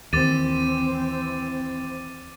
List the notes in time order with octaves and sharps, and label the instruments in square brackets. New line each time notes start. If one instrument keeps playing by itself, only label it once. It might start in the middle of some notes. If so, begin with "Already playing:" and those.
[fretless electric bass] D#2 [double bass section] E3 C4 [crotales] D6 A6 D#7